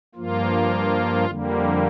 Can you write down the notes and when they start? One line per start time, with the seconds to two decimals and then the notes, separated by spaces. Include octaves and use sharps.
0.15 G2 F3 A#3 F4
1.26 F2 D3 G3 A#3